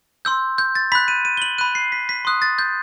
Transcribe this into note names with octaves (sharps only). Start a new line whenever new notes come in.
C6 E6 G6
G6
A6
B5 F#6 B6
D#7
D#7
G7
F#7
B5 F#6 D#7
C7
B6
B6
C6 D#6 F#6
A6
G6